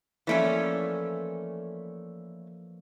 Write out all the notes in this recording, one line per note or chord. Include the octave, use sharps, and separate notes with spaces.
E3 F3 A3 A#3 C#4 D5